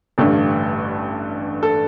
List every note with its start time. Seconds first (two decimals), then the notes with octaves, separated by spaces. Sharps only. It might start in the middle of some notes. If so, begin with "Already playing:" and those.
0.18 A1 G2 D3 A3
1.63 A4